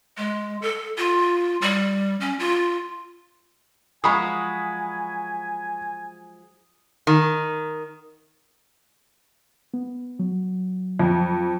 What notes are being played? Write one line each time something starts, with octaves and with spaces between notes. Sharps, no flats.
G#3
A4
F4
G3
C#4
F4
F3 F#3 G#3 G#5 A#5 B5 C#6 D#6
D#3
B3
F#3
F2